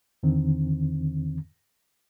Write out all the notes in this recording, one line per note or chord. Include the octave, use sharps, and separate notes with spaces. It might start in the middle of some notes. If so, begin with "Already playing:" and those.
E2 D3 D#3 C4